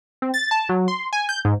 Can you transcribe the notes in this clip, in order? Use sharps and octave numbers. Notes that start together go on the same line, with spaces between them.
C4
A6
A5
F#3
C6
G#5
G6
G#2